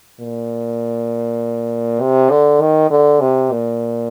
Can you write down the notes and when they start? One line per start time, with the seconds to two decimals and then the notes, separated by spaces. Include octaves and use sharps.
0.20 A#2
2.00 C3
2.30 D3
2.61 D#3
2.90 D3
3.21 C3
3.51 A#2